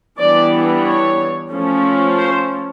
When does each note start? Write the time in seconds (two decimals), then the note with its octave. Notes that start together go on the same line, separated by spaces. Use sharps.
0.19 E3 G3 B3 D4 D5
0.86 C#5
1.52 F3 A3 C#4
2.18 C5